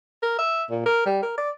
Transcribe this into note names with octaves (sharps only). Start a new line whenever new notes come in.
A#4
E5
A#2
A#4
G3
A#4
D5